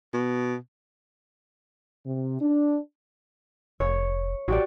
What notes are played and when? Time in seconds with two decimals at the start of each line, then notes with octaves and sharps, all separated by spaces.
0.14 B2
2.06 C3
2.41 D4
3.80 F1 C#5
4.48 A1 F#4 G4 D5